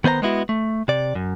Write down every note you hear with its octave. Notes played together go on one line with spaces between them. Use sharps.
D#3 B3 C5 D5 A#5
G#3 B3 E4 F#4
A3
C3 D5
F#2